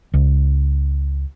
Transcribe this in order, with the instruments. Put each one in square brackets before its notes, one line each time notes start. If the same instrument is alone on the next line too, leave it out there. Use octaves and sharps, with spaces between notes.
[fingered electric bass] C#2